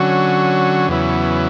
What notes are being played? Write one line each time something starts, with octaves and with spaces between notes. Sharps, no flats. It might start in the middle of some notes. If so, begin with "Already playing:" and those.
Already playing: D3 F#3 C#4 F#4
E2 C#3 F#3 B3 E4